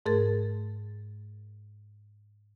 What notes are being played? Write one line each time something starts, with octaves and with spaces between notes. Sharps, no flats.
G#2 A3 G#4 A#4 A6